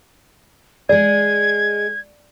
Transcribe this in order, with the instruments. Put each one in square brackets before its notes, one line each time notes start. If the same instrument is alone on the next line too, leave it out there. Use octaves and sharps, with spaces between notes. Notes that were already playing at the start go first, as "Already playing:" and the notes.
[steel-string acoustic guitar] G#3 G#4 [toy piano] D5 [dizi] G#6